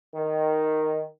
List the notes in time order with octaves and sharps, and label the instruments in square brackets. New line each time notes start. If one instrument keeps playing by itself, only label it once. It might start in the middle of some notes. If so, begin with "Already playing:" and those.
[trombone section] D#3